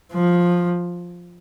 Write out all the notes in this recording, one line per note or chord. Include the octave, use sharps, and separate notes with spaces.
F3